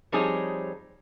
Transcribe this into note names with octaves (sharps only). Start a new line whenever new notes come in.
F3 G3 C4 D#4 G#4 C#5